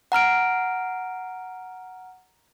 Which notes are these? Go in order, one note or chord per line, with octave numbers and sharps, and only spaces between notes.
F#5 A#5 F6 D7